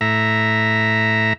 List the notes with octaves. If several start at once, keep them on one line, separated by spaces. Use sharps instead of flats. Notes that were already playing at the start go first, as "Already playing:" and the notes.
A2 E5 A#5